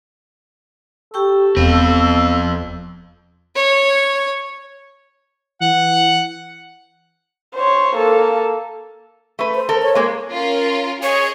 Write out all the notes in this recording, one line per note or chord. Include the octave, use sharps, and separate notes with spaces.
G4 A4 G5 C#6
E1 F2 B3 C4 F5
C#5
E3 F#5
C5 C#5
A#3 A4
A3 B4
C5
A4 A#4
C#5
G#3 A#3 G#4
C#4 F4 A#4
G#4 C#5 D#5